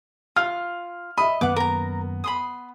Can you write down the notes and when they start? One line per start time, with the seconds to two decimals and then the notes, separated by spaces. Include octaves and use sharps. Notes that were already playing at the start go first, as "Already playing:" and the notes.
0.36 F4 F6
1.18 D#5 E5 B5
1.41 F#2 D#3 A#3 B3 F#5 D6
1.56 A#4 A#5
2.24 B5 C6 D#6